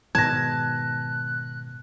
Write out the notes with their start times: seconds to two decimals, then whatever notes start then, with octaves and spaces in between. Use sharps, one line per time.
0.15 G#2 B2 D#3 A5 F#6 G#6 A#6